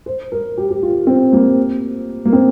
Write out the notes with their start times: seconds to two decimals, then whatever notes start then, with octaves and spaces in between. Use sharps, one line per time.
0.06 C5
0.32 A#4
0.57 G4
0.70 G4
0.83 F4
1.07 C4
1.33 A#3
2.25 A#3
2.33 C4